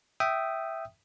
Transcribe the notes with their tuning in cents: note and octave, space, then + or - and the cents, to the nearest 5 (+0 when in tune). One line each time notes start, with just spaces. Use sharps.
E5 +0 G5 -15 D#6 +0